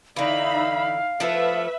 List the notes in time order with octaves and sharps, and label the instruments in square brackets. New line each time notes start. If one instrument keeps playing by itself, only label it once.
[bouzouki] D3 E3 [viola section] D#4 E5 B5 [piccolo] F5
[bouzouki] F3 A3 E4 [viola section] B4 E5